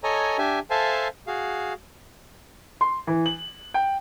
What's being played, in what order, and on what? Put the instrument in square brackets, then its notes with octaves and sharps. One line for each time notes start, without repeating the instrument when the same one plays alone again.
[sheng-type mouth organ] A4 C#5 D#5 G#5 A#5
D4 G4 E5 G#5
A4 C5 E5 F5 G#5 A5
F#4 G#4 F5
[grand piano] C6
E3
F#7
G5